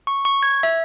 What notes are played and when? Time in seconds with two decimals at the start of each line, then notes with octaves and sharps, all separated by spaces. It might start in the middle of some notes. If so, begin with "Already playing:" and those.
0.07 C#6
0.25 C#6
0.43 G#6
0.63 E5